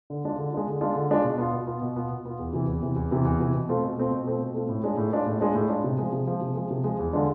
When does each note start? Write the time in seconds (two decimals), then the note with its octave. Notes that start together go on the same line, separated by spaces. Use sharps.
0.10 D3
0.24 G#3 D4 F4
0.38 D3
0.52 G#3 D4 F4
0.67 D3
0.81 G#3 D4 F4
0.95 D3
1.10 G#3 D4 F4
1.24 B2
1.38 B3 F4
1.52 B2
1.67 B3 F4
1.82 B2
1.96 B3 F4
2.11 B2
2.25 B3 F4
2.39 E2
2.53 C3 E3
2.68 E2
2.83 C3 E3
2.96 E2
3.11 C3 E3
3.25 E2
3.40 C3 E3
3.55 B2
3.69 A3 C4 F4
3.83 B2
3.98 A3 C4 F4
4.11 B2
4.26 A3 C4 F4
4.40 B2
4.54 A3 C4 F4
4.69 A2
4.84 G#3 D4 F4
4.97 A2
5.12 G#3 D4 F4
5.26 A2
5.40 G#3 D4 F4
5.55 A2
5.69 G#3 D4 F4
5.84 C3
5.98 F3 G#3
6.12 C3
6.27 F3 G#3
6.41 C3
6.55 F3 G#3
6.71 C3
6.84 F3 G#3
6.99 E2
7.13 D3 G#3 D4 F4